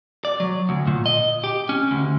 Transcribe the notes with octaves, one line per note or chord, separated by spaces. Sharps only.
D5
F#3
D2
A#2
D#5
G4
C#4
D2